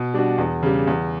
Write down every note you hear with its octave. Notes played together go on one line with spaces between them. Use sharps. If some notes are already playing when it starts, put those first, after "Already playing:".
Already playing: B2
G3 D4 F#4
E2
C#3 G3
E2